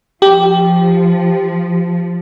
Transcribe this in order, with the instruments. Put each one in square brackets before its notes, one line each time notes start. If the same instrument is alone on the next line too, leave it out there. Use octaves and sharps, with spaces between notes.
[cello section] F3 [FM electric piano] G4